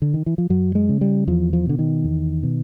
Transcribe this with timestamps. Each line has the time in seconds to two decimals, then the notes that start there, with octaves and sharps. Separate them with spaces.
0.02 D3
0.14 D#3
0.26 E3
0.38 F3
0.50 F#2 F#3
0.75 G#3
0.89 C#3
1.01 G3
1.27 E2 F3
1.53 F3
1.66 B2 D3
1.79 D#3
2.04 E2
2.43 B2